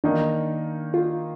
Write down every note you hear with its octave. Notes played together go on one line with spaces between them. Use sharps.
D#3 A#3 D4 D#4
F4